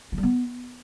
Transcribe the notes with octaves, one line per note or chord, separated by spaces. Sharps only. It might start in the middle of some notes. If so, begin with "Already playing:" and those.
F3
G3
B3